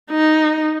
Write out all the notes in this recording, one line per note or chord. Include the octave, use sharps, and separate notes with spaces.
D#4